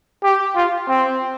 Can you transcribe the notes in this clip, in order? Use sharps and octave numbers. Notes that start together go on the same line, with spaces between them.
G4
F4
C4